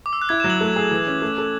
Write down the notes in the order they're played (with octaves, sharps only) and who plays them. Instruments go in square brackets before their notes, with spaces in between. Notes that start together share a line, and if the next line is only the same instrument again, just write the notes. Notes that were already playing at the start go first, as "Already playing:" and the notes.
[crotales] D6
E6
F#6
[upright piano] E4 [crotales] G#6
[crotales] E7
[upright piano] F#3
[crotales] F#7
[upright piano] A3
G#4
E3
C#4
A3
A4